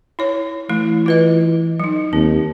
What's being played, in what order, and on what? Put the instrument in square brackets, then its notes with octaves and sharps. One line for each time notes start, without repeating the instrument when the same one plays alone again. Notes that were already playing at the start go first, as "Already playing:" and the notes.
[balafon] E4 C#5
[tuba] E3 [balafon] A3 E4
[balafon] F4 B4 D#5
F#3 D#4
[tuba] D#2 [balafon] C4